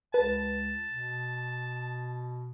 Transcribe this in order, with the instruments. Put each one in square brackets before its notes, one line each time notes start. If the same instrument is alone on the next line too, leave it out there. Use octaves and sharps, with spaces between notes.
[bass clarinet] C#2 [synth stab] B4 [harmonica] A5
[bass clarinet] B2